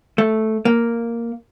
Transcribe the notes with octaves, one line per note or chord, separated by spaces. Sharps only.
A3
A#3